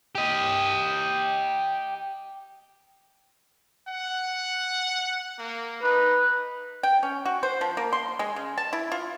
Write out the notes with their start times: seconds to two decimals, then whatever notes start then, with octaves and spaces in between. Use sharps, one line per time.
0.15 G4 D#5
3.88 F#5
5.39 A#3
5.83 D#4 B4
6.83 G5
7.03 C#4
7.26 F#4
7.43 C5
7.61 F3
7.77 A#3
7.93 C6
8.19 G#3
8.36 C#3
8.58 A5
8.73 E4
8.92 F4